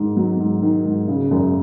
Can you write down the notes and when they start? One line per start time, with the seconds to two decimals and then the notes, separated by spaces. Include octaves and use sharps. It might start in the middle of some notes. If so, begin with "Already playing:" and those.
Already playing: G#2 D#3
0.17 F#3
0.39 G#2
0.62 D#3
0.85 G#2
1.08 C#3
1.31 F#2